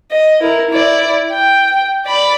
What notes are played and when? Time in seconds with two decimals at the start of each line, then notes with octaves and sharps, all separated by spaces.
0.11 D#5
0.41 E4 A#4
0.71 E4 D5
1.32 G5
2.06 D5 B5